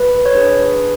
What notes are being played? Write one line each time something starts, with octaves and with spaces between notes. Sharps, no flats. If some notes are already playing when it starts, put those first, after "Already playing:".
Already playing: B4
C#5
D4 G#4 B4